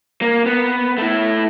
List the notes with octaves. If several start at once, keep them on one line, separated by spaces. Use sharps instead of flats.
A#3
B3
A3 E4